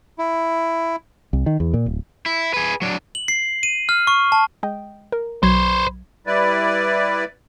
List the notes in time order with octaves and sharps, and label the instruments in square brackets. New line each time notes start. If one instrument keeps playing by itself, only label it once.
[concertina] E4
[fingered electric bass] C2
D#3
E2
A#2
D1
[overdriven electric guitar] E4
G#4 B4
F#3 D4
[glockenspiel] F#7
C7
D#7
F6
C#6
A5
[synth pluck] G#3 D#5 G5
A#4
[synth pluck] B1 F#3 G#6 [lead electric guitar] B4 C5
[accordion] G3 E4 B4 D5